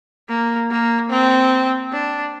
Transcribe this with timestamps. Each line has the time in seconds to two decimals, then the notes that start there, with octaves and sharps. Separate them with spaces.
0.29 A#3
0.70 A#3
1.11 C4
1.93 D4